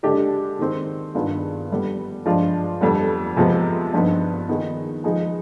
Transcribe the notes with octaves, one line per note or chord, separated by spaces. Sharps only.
D3 G#3 D4 G4
D#3 G#3 C4
G2 D#3 B3 F4 G#4
D3 G3 B3
G2 F3 G#3 D4 F4
F2 D3 G3 B3
C3 F3 G#3 B3
G2 F3 B3 D#4
D#3 B3 D#4 G#4
F3 G#3 B3 D#4 G#4